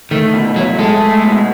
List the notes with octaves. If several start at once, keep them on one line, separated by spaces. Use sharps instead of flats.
D#3 A3
B2
F#3 E4
G#3 A4
A3
B2